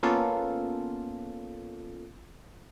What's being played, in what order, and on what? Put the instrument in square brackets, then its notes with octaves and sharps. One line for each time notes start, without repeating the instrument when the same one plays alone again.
[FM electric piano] A#3 B3 C#4 F4 A4